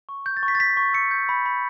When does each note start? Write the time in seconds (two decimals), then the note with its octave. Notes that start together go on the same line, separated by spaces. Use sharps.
0.09 C#6
0.26 G6
0.37 A6
0.43 C#6
0.48 B6
0.55 A6
0.59 C#6 B6
0.77 C#6
0.93 E6 C#7
1.11 G6
1.29 B5
1.46 B5